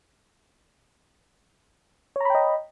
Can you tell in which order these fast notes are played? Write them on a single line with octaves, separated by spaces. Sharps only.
C#5 A#5 B5 G5 D#5